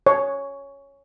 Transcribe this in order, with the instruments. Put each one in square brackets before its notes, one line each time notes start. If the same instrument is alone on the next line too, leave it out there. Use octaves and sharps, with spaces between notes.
[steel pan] C#5